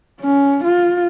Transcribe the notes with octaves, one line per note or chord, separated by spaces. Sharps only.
C#4
F4